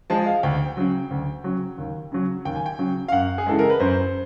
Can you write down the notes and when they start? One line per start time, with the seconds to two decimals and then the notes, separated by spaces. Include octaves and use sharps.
0.10 F3 G#3 A5
0.26 F5
0.43 D2 G5
0.77 C#3 F#3
1.11 D2
1.44 C#3 F#3
1.78 D#2
2.12 C#3 F#3
2.45 D#2 G5
2.56 G#5
2.66 G5
2.79 C#3 F#3
3.08 F5
3.12 F#2 F#5
3.38 G#4
3.47 C#3 E3 G#3 A4
3.59 A#4
3.70 B4
3.80 F#2 C5